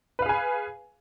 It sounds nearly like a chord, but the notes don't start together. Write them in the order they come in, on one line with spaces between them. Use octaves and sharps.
B4 F5 G#4 G#5